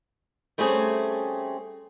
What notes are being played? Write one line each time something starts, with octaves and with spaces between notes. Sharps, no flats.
G3 A3 C4 C#4 G#4